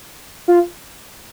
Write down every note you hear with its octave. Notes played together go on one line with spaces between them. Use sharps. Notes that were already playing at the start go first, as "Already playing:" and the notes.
F4